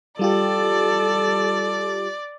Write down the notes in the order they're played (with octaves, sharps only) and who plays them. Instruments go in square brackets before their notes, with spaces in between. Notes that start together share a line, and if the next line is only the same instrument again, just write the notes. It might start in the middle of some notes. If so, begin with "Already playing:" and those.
[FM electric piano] G3 F4 G4 [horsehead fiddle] A4 [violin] D5